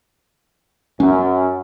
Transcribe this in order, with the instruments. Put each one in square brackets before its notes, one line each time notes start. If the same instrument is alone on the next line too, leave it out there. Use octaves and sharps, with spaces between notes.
[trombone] F#2 [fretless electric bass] C#4